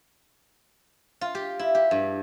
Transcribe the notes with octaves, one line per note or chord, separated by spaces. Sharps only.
F4
G4
E4
G4
G2